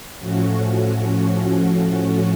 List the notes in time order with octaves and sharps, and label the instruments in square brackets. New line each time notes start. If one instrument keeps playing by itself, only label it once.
[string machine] A2 F3 A3 C#4 F#4